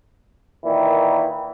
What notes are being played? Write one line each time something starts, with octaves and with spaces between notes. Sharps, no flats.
A#2 D#3 E3